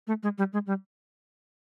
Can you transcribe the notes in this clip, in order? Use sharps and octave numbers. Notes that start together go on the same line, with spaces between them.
A3
G#3
G3
G#3
G3